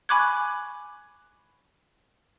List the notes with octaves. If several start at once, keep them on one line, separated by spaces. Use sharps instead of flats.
G#5 B5 C#6 D6 F#6 G#6